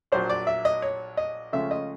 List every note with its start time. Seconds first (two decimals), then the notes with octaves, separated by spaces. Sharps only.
0.12 A#1 A#2 F#3 C5
0.30 D5
0.47 E5
0.65 D#5
0.82 C#5
1.17 D#5
1.53 C#2 C#3 F3 A3 E5
1.71 D#5